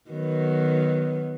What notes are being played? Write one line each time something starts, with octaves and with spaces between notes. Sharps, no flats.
D#3 F#3 B3